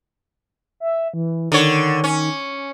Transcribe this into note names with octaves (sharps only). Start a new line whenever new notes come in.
E5
E3
D3 D#3 C#5
C#4